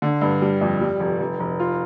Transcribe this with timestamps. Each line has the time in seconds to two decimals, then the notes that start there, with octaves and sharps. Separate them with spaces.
0.02 D3
0.21 G2
0.42 G3
0.61 F2
0.81 G3
1.00 F1
1.20 F1
1.40 F1
1.60 F4